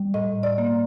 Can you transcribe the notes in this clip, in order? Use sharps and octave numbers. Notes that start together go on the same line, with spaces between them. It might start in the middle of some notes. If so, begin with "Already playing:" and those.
Already playing: G3
A2 D#5
D5
A#3